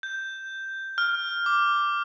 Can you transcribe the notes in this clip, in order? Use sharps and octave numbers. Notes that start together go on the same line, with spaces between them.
G6
F6
D6